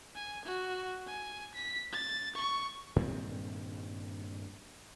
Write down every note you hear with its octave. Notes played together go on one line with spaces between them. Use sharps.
G#5
F#4
G#5
B6
A6
C#6
G2 A#2 D#3 C4